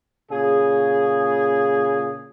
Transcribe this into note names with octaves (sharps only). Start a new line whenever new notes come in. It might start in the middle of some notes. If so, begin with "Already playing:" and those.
A#2 C#3 G#4